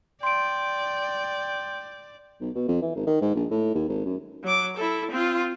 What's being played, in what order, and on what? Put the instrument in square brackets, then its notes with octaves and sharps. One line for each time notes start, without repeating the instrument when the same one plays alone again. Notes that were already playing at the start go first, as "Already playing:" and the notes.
[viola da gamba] D5 [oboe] G5 [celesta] C6 D7
[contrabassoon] B1
B2
F2
E3
G#1
D#3
G#2
A#1
A2
D#2
G#1
F#2
[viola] F#3 D6
E4 A4
C4 F4